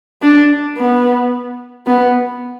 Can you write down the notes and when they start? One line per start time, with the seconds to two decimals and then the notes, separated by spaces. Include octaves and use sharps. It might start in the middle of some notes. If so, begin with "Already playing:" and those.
0.22 D4
0.78 B3
1.87 B3